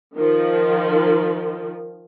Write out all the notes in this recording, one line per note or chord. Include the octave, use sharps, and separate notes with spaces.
D#3 F3